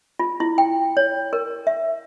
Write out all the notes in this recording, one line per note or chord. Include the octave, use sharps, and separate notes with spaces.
F4
E4
G5
C#5
A#4
E5